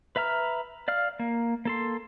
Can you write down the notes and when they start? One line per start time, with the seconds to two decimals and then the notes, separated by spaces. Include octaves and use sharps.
0.16 B4 E5 A#5 F6
0.88 D5 F5 F6
1.19 A#3
1.65 A#3 A4 C6